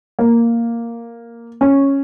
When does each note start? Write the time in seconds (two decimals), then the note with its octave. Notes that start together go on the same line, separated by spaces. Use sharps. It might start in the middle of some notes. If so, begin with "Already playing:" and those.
0.19 A#3
1.61 C#4